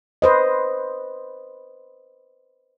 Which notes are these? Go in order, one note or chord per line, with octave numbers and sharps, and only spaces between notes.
B4 C5 D#5